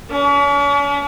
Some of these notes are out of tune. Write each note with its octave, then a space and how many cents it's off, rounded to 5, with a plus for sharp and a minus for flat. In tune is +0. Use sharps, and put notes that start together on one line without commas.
C#4 +45